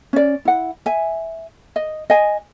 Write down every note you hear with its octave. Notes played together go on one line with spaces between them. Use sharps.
C#4 D5
E4 F#5
E5 G#5
D#5
D#5 G#5